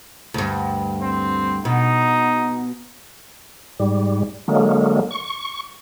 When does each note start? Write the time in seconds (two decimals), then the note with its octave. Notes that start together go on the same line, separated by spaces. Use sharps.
0.34 D2 G2
1.03 C4
1.65 B2 D#4
3.79 G#2 G3
4.48 D3 F#3 G#3 A#3
5.11 C#6